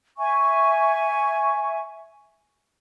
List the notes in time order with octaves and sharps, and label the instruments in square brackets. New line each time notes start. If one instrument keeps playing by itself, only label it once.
[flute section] E5 G#5 C#6